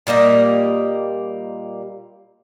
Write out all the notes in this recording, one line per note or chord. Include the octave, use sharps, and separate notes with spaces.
A#2 G3 A#3 D#5